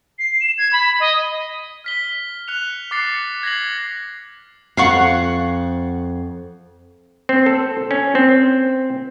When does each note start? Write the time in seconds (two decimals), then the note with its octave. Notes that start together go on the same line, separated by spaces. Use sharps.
0.19 C7
0.40 E7
0.58 G#6
0.73 B5
1.00 D#5
1.84 F6 B6 G7
2.48 F#6 C#7 F7
2.91 D6 F#6 A6 C7 C#7
3.43 G#6 A#6 C7 F#7
4.77 F2 F5 F#5 C#6
7.29 C4
7.46 A4
7.91 C#4
8.15 C4